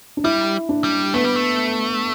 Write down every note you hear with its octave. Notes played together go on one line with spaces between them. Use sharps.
D4
G3 E4
D4
G3
A3 B3
G3
A3